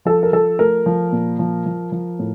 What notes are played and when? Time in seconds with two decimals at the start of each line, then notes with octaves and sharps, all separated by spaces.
0.05 F3 A4
0.23 A#4
0.33 F3 A4
0.59 A3 A#4
0.86 F3
1.12 A#2
1.39 F3
1.66 F3
1.92 F3
2.19 A2